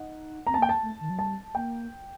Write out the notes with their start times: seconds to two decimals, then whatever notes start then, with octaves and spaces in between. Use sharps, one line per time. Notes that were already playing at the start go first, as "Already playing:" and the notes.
Already playing: D#4 F#5
0.47 C4 A#5
0.54 A5
0.58 A#3 G5
0.69 A5
0.83 A3
1.01 D#3
1.10 F#3
1.19 G3 A5
1.55 A#3 G5